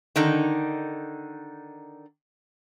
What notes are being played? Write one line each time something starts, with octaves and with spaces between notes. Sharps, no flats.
D3 D#3 D#4